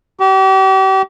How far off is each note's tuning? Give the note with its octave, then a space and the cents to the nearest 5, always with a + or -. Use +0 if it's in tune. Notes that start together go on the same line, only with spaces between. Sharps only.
G4 -40